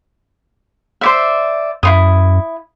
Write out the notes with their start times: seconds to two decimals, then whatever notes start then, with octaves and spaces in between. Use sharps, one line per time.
1.01 C5 D5 E5
1.83 F#2 E4 C5 D#6